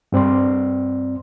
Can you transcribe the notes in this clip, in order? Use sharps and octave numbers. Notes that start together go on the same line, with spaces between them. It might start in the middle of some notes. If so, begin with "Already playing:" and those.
G2 C4 D5 C6